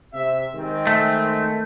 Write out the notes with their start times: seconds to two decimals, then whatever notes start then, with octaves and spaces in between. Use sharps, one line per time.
0.13 C3 E5
0.55 D#3 G#3 C4
0.87 A3